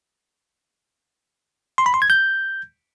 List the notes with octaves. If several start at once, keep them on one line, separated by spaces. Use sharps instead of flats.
C6
B5
C6
G#6
G6